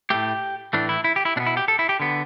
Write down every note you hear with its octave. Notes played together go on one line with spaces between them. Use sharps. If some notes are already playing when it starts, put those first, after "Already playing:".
A2 A3 G4
A2 E3 A3 D4
E4
E4
G4
E4
B2 B3 D4
E4
G4
A4
E4
G4
D3 B3